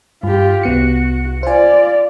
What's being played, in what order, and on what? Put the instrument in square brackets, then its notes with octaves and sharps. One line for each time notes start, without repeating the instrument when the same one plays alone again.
[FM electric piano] G2 [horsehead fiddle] F4 G4
[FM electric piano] C2 B3 C#7 [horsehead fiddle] F#4
[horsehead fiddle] F4 D5 [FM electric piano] C5 G#5